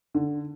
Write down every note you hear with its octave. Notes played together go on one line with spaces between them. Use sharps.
D3